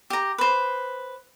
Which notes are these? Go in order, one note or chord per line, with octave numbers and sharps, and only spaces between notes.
G4 A#5
B4 C5